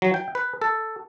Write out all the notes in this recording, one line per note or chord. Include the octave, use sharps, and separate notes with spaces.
F#3
G5
B4
A4